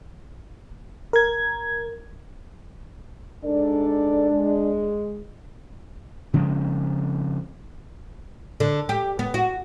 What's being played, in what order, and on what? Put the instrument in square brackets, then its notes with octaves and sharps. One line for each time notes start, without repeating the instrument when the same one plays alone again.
[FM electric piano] A#4 G#6
[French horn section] G#2 A4 D5 [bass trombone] D4
[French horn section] G#3
[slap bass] C#3 F3 G#3 C4
[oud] D3
G4
B3
F#4